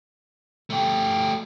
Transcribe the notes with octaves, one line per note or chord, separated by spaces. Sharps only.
A3 G4